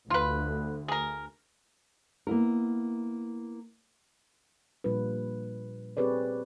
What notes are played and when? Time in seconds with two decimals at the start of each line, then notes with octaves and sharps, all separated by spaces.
0.10 D2 F4 B4
0.88 G#4 A#4
2.27 A#3 B3 E4 A#4
4.84 A#2 F3 G3 D4 F4 B4
5.97 C4 G4 G#4 B4 C#5 D5